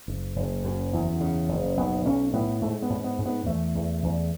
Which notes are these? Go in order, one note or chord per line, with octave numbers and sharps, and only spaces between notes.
F#1
F#1
F#2
E2
C#3
F#1
B1 B3
B1 C#4
A2 B3
G#2 A3
B3
G#2
B3
G#2
B3
E2 A3
E2
E2